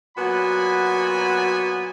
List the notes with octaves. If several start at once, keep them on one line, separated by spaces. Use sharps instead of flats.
A#2 F#3 B3 F#4 G#5 B5